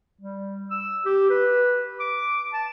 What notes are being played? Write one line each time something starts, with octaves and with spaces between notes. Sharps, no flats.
G3
E6
G4
B4
D6
A5